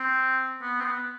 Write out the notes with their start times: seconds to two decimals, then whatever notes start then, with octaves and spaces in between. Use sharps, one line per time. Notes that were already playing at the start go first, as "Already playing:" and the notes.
Already playing: C4
0.62 B3
0.80 C4
0.84 B3